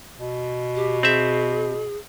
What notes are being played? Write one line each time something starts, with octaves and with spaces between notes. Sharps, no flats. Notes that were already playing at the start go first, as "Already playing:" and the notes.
B2
G4
C4 G#4 E5